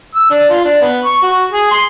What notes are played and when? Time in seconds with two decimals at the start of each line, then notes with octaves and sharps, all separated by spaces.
0.15 E6
0.31 D4
0.50 F4
0.65 D4
0.81 B3
1.05 C#6
1.23 F#4
1.52 G#4
1.71 C6